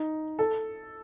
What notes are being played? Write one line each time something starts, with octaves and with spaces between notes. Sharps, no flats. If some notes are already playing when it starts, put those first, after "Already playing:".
Already playing: D#4
A4